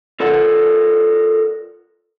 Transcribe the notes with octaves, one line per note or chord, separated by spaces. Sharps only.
F4 A4 A#4 D5 F#5